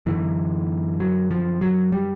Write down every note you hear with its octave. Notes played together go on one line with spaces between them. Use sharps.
F#2 D3 E3
F#3
F3
F#3
G3